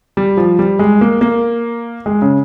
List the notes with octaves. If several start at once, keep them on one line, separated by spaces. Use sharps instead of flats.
G3
F3
G3
G#3
A#3
A#3
G#3
C#3